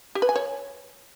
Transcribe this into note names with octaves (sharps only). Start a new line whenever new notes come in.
G4
B4
G#5
C#5